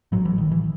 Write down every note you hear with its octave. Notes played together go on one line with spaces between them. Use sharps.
A1 A2 F#3
E3
D#3
E3